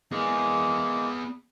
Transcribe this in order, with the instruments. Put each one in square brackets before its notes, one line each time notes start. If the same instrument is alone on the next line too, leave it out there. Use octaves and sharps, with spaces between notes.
[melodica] G#3 A#3 [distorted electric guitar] B3 G#4